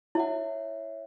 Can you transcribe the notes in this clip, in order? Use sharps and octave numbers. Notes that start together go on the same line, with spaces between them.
E4 C#5 E5 F#5